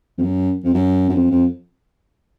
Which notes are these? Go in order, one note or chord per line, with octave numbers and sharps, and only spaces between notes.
F2
F#2
F2
F#2
F#2
F2
F2